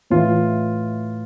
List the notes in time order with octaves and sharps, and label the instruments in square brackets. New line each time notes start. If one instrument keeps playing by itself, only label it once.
[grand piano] A2 E3 F4